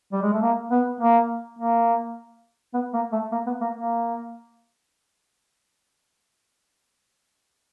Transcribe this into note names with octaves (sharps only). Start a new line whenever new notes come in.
G3
G#3
A3
A#3
B3
A#3
A#3
B3
A#3
A3
A#3
B3
A#3
A#3